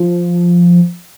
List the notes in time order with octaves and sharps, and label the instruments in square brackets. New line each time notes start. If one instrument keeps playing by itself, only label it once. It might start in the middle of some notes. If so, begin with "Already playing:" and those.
Already playing: [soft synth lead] F3